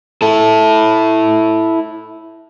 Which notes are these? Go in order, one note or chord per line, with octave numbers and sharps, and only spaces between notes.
E4 A4